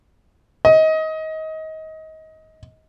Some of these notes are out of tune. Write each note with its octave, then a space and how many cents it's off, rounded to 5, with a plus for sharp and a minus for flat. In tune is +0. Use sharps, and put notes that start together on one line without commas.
D#5 +25